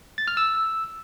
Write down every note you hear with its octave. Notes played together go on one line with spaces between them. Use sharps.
A6
F6
E6